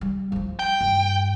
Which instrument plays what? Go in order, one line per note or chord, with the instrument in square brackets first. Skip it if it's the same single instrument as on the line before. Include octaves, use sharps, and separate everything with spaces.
[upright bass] G3
F3 F4
[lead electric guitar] G5
[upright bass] G2